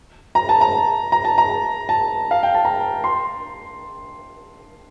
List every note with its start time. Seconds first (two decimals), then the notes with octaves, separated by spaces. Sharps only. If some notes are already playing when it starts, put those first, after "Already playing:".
0.35 A#5
0.49 A5
0.61 A#5
1.12 A#5
1.25 A5
1.38 A#5
1.89 A5
2.31 F5
2.43 G5
2.54 A5
2.65 A#5
3.04 C6